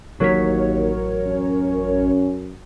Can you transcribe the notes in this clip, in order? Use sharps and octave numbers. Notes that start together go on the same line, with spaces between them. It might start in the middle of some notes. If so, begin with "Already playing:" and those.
A1 D#2 F#3 A#4 C#5 B6
F#2 C#4